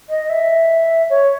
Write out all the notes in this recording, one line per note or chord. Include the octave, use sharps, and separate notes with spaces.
D#5
E5
C#5